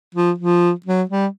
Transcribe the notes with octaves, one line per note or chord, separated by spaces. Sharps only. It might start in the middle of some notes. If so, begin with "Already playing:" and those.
F3
F3
F#3
G3